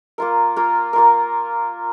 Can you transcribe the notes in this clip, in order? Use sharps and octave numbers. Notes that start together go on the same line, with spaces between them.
A#3 F4 A#4
A#3 F4 A#4
A#3 F4 A#4